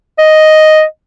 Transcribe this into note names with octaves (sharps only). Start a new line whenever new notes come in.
D#5